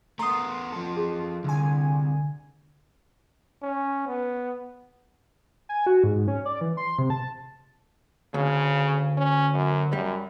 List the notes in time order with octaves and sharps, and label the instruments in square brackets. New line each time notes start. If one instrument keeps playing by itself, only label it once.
[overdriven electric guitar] A3 B3 [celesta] A#5 D#6 [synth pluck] C6
[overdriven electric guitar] F3 A4
[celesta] G#4
[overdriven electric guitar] C2 [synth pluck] D3 G#5
[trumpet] C#4
B3
[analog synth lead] G#5
F#4
G#2
C#4
D5
E3
C6
C3
A5
[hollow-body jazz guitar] D2 [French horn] C#3
[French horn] C#4
F#2
[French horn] F#2 [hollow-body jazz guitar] G3